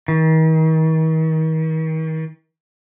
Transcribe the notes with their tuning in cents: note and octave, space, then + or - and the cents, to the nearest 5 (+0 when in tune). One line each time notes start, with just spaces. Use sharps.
D#3 +40